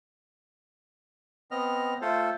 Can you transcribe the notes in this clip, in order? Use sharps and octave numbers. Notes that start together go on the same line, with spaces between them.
B3 C4 D#5 F6
A3 F4 A4 C5